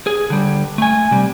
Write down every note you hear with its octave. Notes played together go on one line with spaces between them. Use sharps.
G#4
D3 G3
A3 G#5
C3 G3